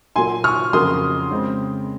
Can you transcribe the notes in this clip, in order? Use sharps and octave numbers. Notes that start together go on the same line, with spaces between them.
A#2 F#3 A#3 G#5 C6
C#6 F6
F2 C#3 F#3 A#3 C6 D#6
C#3 G#3 C4